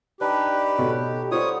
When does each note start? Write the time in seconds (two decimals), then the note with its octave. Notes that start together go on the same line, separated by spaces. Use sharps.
0.21 D4 D#4 G4 B4
0.78 B2 A4 C#5
1.32 G3 F4 C5 C#5 F#5 G5 D#6